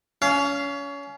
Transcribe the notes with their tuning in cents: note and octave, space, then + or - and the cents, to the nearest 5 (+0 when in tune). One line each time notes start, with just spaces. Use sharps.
C#4 +30 F5 -10